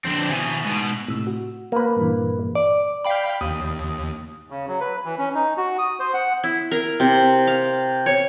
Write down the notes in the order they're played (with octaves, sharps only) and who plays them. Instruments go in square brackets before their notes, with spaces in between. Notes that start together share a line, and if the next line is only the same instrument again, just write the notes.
[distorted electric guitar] F2 D3 [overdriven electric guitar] C4 D4
[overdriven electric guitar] B2 E3 [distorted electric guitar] D#3 G#5
[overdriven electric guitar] B2 [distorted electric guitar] G#3 D#4
[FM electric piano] A2 C3 E6
F#4
[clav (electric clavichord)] A#3 B4
[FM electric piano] G2 A#2 E3
[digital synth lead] D5
[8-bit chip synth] F5 G5 B5
[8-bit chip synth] D#2 [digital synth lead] D#6
[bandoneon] C#3
F#3
B4
E3
C#4
D#4
F#4
D#6
C5
F#5
[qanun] E4
A#4
C3
F5
C#5